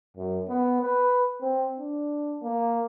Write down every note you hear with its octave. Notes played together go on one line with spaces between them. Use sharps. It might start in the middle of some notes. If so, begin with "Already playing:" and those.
F#2
B3
B4
C4
D4
A#3